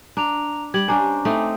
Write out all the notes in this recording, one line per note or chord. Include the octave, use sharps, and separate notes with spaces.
D4 A#5 F7
G3 G#6 F#7
C#4 D4 C5 G#5 A#5 D6
A3 C4 D#4